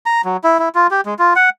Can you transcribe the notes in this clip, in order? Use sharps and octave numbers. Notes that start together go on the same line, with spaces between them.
A#5
F#3
E4
E4
F4
G4
G#3
F4
F#5